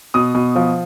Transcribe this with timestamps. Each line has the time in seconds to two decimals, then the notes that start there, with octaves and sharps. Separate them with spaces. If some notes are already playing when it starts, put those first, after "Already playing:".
0.14 B2 D#6
0.35 B2
0.55 F3